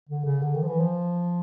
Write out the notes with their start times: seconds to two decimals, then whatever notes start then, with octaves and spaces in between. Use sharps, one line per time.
0.09 D3
0.25 C#3
0.42 D3
0.55 D#3
0.62 F3
0.67 E3
0.80 F3